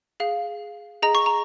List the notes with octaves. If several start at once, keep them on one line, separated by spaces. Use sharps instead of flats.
G#4 F5
G#4 D#5 A#5
C#6
A#5